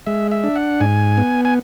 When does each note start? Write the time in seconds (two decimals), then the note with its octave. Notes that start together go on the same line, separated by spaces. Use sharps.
0.06 G#3 E5
0.31 E5
0.44 D4
0.56 F#5
0.81 G#2 G#5
1.17 B3
1.45 G#5